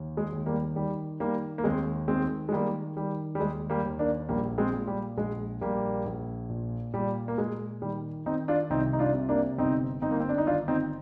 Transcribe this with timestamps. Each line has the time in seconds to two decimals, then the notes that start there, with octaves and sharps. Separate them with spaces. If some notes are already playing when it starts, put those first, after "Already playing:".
Already playing: D#2
0.17 G#3
0.32 D#2
0.46 G3 A#3
0.76 D#3 G3
1.20 D#3 G3 A#3
1.58 A#3
1.64 D#2 G#3 C4
2.08 D#3 G#3 C4
2.49 G#3
2.52 D#3 G3 A#3
2.96 D#3 G3
3.35 G3
3.40 D#2 G#3
3.70 G3 A#3
3.85 D#2
3.99 A#3 D4
4.29 A#1 G3 A#3
4.58 G#3 C4
4.74 A#2
4.87 G3
5.17 A#1 G#3
5.61 A#1 G3 A#3
6.05 A#1
6.50 A#2
6.94 A#2 G3
7.28 A#3
7.37 A#2 G#3
7.82 D#3 G3
8.26 D#3 C4 D#4
8.48 D4 F4
8.70 C2 C4 D#4
8.93 D#4
8.99 D4 F4
9.14 C3
9.29 A#3 D4
9.58 G1 C4 D#4
10.02 G1 C4 D#4
10.11 A#3
10.20 C4
10.29 D4
10.38 D#4
10.46 D#3 D4 F4
10.68 C4 D#4